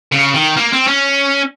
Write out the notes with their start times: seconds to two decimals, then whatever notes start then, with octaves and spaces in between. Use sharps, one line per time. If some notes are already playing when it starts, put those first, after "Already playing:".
0.12 C#3
0.34 D#3
0.57 A#3
0.73 C4
0.87 C#4